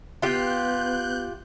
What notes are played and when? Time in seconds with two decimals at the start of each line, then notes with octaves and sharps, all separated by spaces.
0.22 B3 F4 G4 F#6 G6